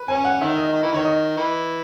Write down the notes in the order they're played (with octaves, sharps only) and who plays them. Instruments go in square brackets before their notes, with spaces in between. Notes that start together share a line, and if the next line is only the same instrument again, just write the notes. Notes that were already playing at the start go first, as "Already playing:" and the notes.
Already playing: [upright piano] B4
[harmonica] C#4 [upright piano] G#5
[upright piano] F#5
[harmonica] D#3 [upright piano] E5
[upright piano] D#5
[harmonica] D#3
E3
[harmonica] D#3 [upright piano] C#5
[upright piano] D#5
[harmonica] E3